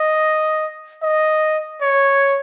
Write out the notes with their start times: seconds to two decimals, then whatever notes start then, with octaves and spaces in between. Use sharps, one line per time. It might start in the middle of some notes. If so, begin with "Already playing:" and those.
Already playing: D#5
1.02 D#5
1.81 C#5